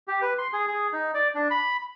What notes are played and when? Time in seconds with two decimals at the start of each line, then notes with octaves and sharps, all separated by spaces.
0.08 G4
0.22 B4
0.38 C6
0.53 G#4
0.67 G#4
0.93 D#4
1.14 D5
1.35 D4
1.51 B5